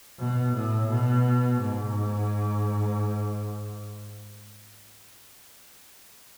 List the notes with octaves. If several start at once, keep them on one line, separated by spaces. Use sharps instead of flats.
B2
A2
B2
G#2